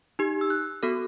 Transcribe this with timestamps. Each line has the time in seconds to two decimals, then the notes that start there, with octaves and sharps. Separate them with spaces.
0.19 D#4 G4
0.41 E6
0.50 F#6
0.83 B3 F#4 A4